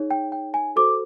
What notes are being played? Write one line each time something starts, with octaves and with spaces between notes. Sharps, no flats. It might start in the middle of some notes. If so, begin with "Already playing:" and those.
Already playing: D#4 G#4 C#5
G5
G5
G#5
F#4 A4 C5 D6